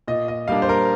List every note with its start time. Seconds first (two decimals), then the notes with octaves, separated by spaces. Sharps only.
0.08 A#2 D#5
0.28 D#5
0.48 G3 A#3 D4 F5
0.62 C5
0.69 A#4